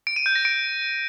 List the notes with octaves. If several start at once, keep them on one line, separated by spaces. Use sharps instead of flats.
D7
D#7
G6
A#6
D7